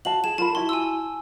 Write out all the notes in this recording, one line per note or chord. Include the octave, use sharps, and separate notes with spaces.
F#4 F5 A5 F#7
G#4 E7
F4 A#4 A5 B5
E4 F#4 C6
G#5 C6 E6